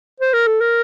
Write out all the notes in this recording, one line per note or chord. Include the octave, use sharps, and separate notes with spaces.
C5
A#4
A4
A#4